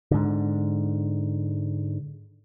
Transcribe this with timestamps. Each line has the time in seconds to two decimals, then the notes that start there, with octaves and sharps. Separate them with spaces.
0.11 G#2 D3